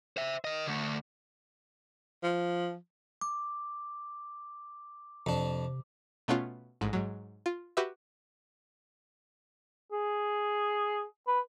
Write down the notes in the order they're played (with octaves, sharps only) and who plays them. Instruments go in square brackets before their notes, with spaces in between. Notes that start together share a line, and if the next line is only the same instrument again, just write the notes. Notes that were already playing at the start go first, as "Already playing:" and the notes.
[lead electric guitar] C5 E5
A#4 D#5
D3 A3
[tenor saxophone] F3
[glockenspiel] D6
[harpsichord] F2 D4 [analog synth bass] C3
[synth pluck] B2 A3 B3 C#4 F4
A1 G#2
G#2 F#3
F4
F#4 G4 B4 E5
[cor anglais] G#4
B4